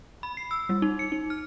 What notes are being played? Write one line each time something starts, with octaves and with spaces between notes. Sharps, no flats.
B5
C7
E6
G3
D#4
C#7
D#4
F6